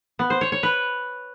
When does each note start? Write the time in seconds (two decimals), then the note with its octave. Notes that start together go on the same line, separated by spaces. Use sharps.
0.19 B3
0.30 C5
0.41 C#5
0.52 C#5
0.63 B4